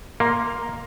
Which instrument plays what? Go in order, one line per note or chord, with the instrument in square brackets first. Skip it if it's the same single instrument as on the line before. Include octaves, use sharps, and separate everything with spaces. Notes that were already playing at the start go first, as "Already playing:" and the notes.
[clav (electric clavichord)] A#3 [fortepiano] F5 A#5 C6